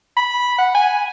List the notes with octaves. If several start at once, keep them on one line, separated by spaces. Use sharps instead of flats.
B5
F#5
G#5